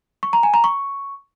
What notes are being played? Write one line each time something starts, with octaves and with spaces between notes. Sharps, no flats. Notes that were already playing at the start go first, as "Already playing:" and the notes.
C#6
A#5
G#5
A#5
C#6